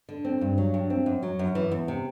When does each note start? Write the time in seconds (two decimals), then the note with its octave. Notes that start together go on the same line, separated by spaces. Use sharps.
0.09 D3
0.25 C4
0.41 G2
0.58 F#3
0.74 G2
0.90 C4
1.06 F#2
1.23 F#3
1.39 F#2
1.55 E3
1.72 E2
1.88 C3